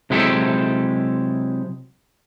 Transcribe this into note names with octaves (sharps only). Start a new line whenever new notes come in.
C3 F#3 G#3 E4 G4 A4